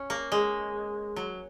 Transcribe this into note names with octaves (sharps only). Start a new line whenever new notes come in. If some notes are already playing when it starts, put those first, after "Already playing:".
Already playing: C#4
A#3
G#3
F#3